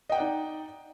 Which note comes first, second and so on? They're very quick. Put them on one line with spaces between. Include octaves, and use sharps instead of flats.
D#5 G5 F#5 D5 D#4